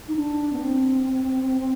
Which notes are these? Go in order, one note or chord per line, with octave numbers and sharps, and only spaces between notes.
D#4
D4
B3
C4